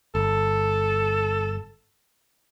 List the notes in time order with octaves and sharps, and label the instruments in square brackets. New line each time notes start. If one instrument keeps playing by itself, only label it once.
[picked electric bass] G1 [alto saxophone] A4